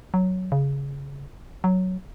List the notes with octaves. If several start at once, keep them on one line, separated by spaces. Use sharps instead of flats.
F#3
C#3
F#3